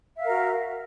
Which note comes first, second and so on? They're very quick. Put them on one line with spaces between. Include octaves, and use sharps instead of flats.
E5 F5 A#4 F#4